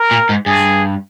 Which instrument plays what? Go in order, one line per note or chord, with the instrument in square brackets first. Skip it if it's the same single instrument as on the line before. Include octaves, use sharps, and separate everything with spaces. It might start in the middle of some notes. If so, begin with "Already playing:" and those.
Already playing: [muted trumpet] A#4
[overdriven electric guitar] A#2
G#2
[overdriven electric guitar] G2 [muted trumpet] G#4